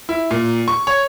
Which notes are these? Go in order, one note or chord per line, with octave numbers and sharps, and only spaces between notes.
E4
A#2
C#6
C#5